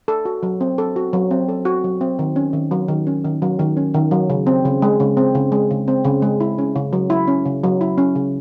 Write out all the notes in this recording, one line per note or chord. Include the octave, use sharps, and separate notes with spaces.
A4
F#4
F#3
C4
A4
F#4
F#3
C4
A4
F#4
F#3
C4
D#3
C#4
D#3
F#3
D#3
C#4
D#3
F#3
D#3
C#4
D#3
F#3
C#3
C4
C#3
G#3
C#3
C4
C#3
G#3
C#3
C4
C#3
G#3
E4
C#4
C#3
F#3
E4
C#4
C#3
F#3
E4
C#4
C#3